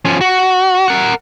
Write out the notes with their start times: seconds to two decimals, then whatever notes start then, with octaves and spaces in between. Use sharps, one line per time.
0.05 F3 C#4
0.21 F#4
0.88 A#4 F#5